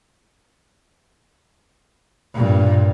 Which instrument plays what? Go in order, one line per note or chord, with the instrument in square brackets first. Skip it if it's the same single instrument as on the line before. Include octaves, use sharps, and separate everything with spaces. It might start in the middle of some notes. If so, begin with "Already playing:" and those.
[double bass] G2 A#2